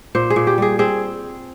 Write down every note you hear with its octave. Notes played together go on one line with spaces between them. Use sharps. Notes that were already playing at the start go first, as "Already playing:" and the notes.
A#2 C5
G#4
A#2
G4
G3 G#4
C4 G#4